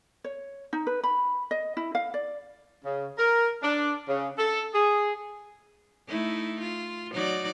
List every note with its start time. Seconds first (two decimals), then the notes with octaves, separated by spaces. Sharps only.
0.24 C#5
0.73 D#4
0.87 B4
1.03 B5
1.51 D#5
1.77 E4
1.95 F5
2.14 D5
2.85 C#3
3.18 A#4
3.63 D4
4.08 C#3
4.38 A4
4.74 G#4
6.08 A3 D#4 E4
6.61 F4
7.12 F#3 D#4 D5